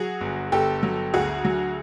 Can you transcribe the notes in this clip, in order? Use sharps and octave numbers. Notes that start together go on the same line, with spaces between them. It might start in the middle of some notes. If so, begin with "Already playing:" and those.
Already playing: F#3 F#4 G#4
G1
G1 G4 A4
F#3
D2 F#4 G#4
F#3